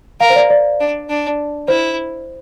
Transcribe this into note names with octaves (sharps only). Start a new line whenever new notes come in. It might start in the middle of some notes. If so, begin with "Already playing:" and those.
A#4 F5
C5
D5
D5
D4
D4
E4 C5